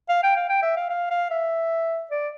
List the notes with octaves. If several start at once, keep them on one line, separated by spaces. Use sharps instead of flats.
F5
G5
F5
G5
E5
F5
F5
F5
E5
D5